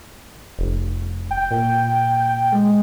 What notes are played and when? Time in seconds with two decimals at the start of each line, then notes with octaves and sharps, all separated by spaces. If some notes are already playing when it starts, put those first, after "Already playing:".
0.59 F1
1.31 G5
1.51 A#2
2.52 G#3